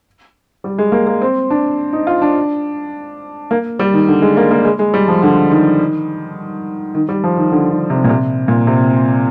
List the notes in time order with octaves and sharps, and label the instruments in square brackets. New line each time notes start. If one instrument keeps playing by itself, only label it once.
[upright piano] G3
G#3
A#3
A#3
C4
D4
D#4
F4
D4
A#3
G3
D#3
D3
G#3
A#3
A#3
G#3
G#3
G3
F3
D3
D#3
D#3
G3
F3
D#3
D3
D3
C3
A#2
C3
A#2
C3